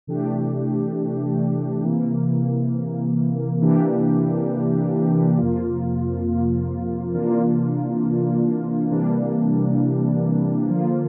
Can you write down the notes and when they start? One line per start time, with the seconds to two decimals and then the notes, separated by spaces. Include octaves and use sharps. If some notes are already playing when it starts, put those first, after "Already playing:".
0.07 C3 E3 A3 D4 G4
1.84 C3 E3 A#3
3.61 C3 E3 A#3 D4 G4
5.37 F2 C3 F3 A#3 F4
7.14 C3 E3 A#3 D4 F4
8.91 C3 E3 G3 A#3 D4
10.68 D3 F3 A#3 F4